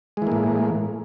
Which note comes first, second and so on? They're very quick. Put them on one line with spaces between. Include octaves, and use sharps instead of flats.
G#3 E3 A#3 A2